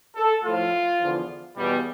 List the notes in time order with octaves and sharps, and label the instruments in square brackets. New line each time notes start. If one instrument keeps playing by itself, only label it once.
[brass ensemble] A4
A2 F3 F4
E2 D3 F3
E2 B2 G3